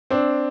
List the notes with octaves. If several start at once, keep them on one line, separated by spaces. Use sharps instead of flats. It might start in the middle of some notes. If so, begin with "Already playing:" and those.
C4 D4